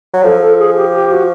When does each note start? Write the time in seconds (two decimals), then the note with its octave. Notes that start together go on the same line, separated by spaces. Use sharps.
0.14 F#3
0.23 F3 A4
0.40 A4
0.59 G#4
0.76 G4
0.93 G4
1.11 F#4